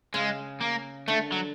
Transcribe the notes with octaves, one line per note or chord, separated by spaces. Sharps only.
C#3 G#3
A#3
D3 A3
F#3